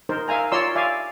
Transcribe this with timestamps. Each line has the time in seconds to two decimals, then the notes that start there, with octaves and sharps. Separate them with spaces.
0.09 D#4 A#4 C5
0.28 A#4 E5 F5 G#5 A#5
0.52 F4 C#5 D5 A#5 C6 E6
0.75 D5 E5 F5 G#5